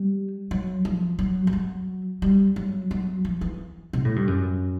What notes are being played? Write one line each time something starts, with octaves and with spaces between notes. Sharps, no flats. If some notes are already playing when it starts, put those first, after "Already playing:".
Already playing: G3
F#3
F3
F#3
G3
F#3
G3
F#3
F#3
F3
E3
C3
A2
G2
F#2